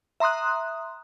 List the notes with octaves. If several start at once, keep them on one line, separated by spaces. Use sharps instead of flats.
E5 A#5 C6 D#6 F#6